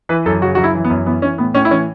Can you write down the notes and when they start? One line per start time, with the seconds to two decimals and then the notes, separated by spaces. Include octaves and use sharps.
0.09 E3 B4
0.26 F#2 A4
0.41 C#3 F#4
0.55 F#2 F#4
0.64 E4
0.74 E3
0.85 B3
0.90 F#2
1.06 E3 B3
1.22 E3 C#4
1.38 A2 B3
1.54 A2 C#4
1.65 E4
1.70 E3 C#4